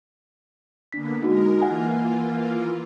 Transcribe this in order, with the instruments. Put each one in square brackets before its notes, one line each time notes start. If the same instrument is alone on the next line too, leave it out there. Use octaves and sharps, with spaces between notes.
[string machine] D3 A#3 B3 [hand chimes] D4 B6
[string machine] G#3 A#4 [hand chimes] D#4 F#4
[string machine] E3 A#3 F4 [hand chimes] F#5 G#5